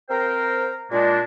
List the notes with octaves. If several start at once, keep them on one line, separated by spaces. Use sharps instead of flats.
C4 A#4 C5 F5 G5 A#5
A#2 G#3 D4